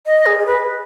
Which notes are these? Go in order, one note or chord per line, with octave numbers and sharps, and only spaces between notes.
D#5
G#4
G#4
B4